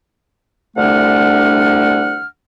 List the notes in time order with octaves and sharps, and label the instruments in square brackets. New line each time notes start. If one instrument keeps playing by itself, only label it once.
[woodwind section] C2 D3 A3 D4 F#5 F6